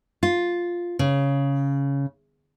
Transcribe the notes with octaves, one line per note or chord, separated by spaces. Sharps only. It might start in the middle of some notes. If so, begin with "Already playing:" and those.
F4
C#3